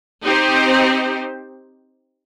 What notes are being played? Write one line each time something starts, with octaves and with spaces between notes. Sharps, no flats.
C4 D#4 G4 C5